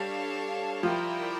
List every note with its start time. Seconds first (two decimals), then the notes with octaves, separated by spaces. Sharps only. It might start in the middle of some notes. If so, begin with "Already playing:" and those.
Already playing: G3 D4 A4 C#5 F5 A5
0.82 F3 E4 G4 A#4 D5 G5